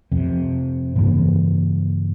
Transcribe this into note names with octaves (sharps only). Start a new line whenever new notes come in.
F2 C3
G2 C#3 E3 A#3